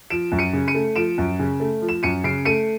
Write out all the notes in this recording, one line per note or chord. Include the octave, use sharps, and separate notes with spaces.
F3 D7 E7
F#2
C#7 D#7
C#3
C#7 D#7
A3
F3 D7 E7
F#2
C#3
A3
F3
E7
F#2 C#7 D#7
C#3 C7 D7
A3 C#7 D#7